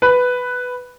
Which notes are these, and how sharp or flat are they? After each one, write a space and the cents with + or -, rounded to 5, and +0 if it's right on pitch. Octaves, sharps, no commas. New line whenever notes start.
B4 +5